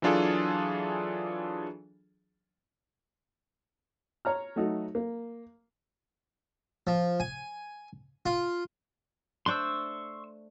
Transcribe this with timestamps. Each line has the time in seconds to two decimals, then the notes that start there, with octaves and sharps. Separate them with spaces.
0.02 E3 F#3 D4 F4 G#4 A4
4.25 C#5 A#5 F6
4.56 F#3 A3 D#4 F#4
4.95 A#3
6.87 F3
7.20 G#5
8.26 F4
9.46 A3 D4 C5 C6 C#6 E6